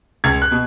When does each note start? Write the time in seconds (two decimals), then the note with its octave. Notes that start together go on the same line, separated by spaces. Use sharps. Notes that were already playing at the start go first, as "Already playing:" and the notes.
0.24 C#2 G#6
0.42 F#6
0.51 B2